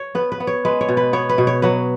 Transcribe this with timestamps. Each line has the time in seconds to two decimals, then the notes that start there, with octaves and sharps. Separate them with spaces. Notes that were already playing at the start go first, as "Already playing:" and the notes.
Already playing: C#5
0.15 B3 B4
0.32 B4
0.40 B3
0.47 C#5
0.65 G#3 B4
0.81 C#5
0.89 B2
0.97 B4
1.13 B3 C#5
1.29 B4
1.38 B2
1.47 C#5
1.62 F#3 B4